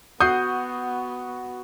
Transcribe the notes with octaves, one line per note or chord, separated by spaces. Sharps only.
B3 F#4 F#5 D#6 G6 C7